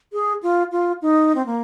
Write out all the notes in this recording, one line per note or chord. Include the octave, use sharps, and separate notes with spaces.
G#4
F4
F4
D#4
C4
A#3